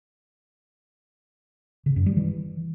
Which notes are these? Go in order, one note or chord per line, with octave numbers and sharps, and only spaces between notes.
C#3
F#2
G3
E3